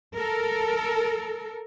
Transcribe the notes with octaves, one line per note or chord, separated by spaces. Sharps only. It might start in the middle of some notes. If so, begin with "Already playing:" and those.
A4 A#4